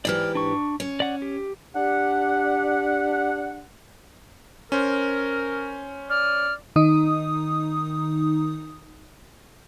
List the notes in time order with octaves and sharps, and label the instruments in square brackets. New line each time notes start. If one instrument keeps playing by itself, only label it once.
[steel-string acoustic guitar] G#2 E3 G4 [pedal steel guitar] D5 F6
[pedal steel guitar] D4 C#6
[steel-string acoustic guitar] C#4
[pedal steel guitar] D5 F#5
G4
[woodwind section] D4 G4 F#5
[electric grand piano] C#4 C5 [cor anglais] A#4
[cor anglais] D5 [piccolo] F6
[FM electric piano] D#3 D#4 D#6